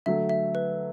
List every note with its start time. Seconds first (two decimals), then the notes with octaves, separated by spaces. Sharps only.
0.06 D3 F#3 A3 E5
0.29 E5
0.55 B4